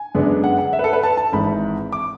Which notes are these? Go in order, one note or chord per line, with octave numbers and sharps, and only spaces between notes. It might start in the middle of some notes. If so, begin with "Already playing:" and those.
Already playing: G#5
F#2 D3 G#3 B3 D4
F#5
F#5
E5
B4
A4
B4
A5
A5
G#1 G#2 E3 B5
D6